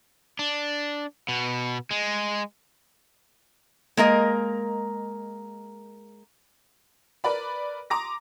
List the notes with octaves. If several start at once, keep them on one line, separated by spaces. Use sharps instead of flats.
D4
B2
G#3
G#3 A#3 A#4 D#5
A#4 B4 D5 B5
A#5 C6 D6 D#6 A#6